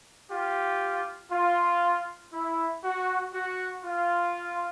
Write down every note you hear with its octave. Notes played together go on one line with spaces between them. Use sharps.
F4 G4
F4
E4
F#4
F#4
F4